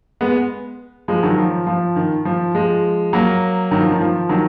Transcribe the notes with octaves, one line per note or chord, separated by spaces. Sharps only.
G#3 B3
F3 G#3
D#3 F#3
F3
F3
D#3
F3
F3 G#3
F#3 A#3
D#3 F#3
F3
D#3
F3
D#3 F#3